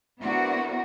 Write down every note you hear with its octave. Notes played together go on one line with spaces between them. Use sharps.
B3 D4 E4 F#4 A#4 C5